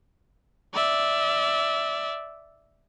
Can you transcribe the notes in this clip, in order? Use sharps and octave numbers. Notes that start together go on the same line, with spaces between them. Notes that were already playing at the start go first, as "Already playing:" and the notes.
D5 E5